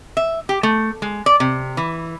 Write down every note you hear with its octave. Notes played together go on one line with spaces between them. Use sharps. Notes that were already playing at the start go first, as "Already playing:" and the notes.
E5
G4
A3
G#3
D5
C3
E3